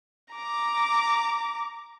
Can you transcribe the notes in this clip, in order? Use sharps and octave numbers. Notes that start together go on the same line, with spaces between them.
A#5 D6